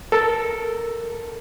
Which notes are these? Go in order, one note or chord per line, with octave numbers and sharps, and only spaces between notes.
A4 A#4